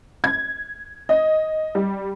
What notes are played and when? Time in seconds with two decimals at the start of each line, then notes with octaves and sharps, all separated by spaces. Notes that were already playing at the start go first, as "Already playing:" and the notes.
0.24 G#6
1.09 D#5
1.75 G3